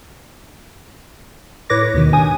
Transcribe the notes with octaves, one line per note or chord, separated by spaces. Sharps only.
A2 B4 C#5 D6 A#6
D#2 G#2 B2 D#3
G2 G#5 D#6